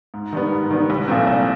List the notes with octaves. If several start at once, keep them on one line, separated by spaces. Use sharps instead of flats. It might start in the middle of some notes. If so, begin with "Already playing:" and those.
G#2
D#3 G3 B3
G#2
D#3 G3 B3
C2
A#2 F3 A3 C4
C2